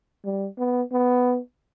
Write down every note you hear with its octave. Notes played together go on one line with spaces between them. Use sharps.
G3
B3
B3